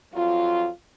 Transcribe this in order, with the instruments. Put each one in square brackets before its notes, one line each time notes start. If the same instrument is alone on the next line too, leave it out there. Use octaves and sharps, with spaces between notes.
[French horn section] F2 F#3 F4